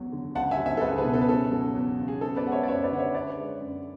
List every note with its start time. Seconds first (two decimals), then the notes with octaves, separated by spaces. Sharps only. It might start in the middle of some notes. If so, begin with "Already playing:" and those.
Already playing: E2 F#3 C#4
0.12 D3
0.35 C#2 F#5 A5
0.51 E5 G#5
0.58 F#3
0.66 E5 G#5
0.77 A4
0.81 C#2 G#4 B4
0.98 G#4 B4
1.05 B2
1.13 A4
1.21 B4
1.29 C#4 A4
1.51 F#3
1.75 E2
1.99 C#3
2.08 G#4
2.21 B3 A4
2.36 B4 D5
2.45 G#3 F#5
2.52 C#5 E5
2.63 D5
2.68 F#2 C#5 E5
2.83 B4 D5
2.92 D3 F#5
2.99 C#5 E5
3.14 C#4 B4 D5
3.37 G#3
3.61 F#2